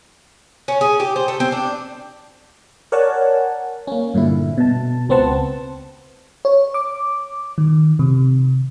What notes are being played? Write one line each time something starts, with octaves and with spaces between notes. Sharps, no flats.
C#4
G#4
G4
C5
A3
C4
D4
A#4 C#5 D5 F#5 G#5 A5
A#3 C#4
G2 A#2 D3 E4
B2 A5
C#2 B3 C4 C5 F#5 A5
C#5
D6
D#3
C3